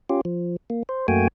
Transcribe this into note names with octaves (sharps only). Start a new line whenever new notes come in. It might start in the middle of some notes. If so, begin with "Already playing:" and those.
C#4 F4 G4
F3
A#3
C5
F#2 A3 A#3 F#4 G5 G#5